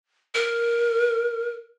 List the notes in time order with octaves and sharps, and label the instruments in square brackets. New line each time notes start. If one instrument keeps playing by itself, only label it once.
[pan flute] A#4